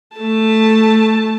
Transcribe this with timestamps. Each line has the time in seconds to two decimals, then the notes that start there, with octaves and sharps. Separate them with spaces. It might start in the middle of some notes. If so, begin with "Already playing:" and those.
0.17 A3 A5